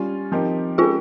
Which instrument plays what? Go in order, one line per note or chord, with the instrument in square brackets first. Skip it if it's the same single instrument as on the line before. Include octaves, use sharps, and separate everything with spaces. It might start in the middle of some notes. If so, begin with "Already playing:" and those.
Already playing: [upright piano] G3 C#4 F4
F3 C4 D#4 G4 A#4
[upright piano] G#3 C#4 G4 A#4 [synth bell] F4 G#4